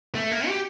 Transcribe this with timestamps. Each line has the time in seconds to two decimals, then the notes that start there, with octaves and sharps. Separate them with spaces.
0.15 A3
0.31 A#3
0.47 G4